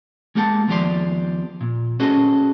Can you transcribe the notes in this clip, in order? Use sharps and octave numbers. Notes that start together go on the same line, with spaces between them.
G#3 A#3 G4 F#5 G#5 A5
D#2 F3 B3 G4 D5 C6
A#2
C#4 F#4 G#4 A4 B4 D#5